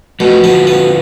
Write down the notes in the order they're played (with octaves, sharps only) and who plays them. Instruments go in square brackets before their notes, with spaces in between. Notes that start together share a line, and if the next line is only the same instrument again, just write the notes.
[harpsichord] B2 [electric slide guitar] F3 A3
[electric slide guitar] D3 F3 [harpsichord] B3
[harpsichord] B3